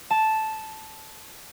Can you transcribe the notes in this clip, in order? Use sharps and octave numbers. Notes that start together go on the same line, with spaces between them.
A5